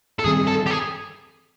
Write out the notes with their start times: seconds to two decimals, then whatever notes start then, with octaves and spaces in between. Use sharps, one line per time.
0.19 A4
0.24 G2 D#3 G3 C4 G#4
0.47 A4
0.66 G4
0.70 G#4